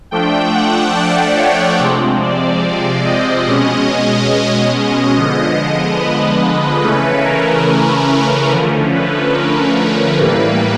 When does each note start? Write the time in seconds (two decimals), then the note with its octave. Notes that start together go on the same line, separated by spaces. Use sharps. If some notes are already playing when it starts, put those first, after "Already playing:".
0.11 F3 A3 D4 G5
0.54 F#5
0.96 D5
1.37 C#5
1.80 C3 F3 G#3 C4
2.22 D5
3.05 D#5
3.47 B2 G#3 C#4 D#5
4.73 D#5
5.15 D3 F3 G#3 B3 D#5
5.99 B4
6.82 C#3 E3 A3 C#4 B4
7.24 A#4
8.50 D3 F3 A3 C#4
8.93 B4
9.34 A#4
10.19 A2 E3 G3 A#3 B4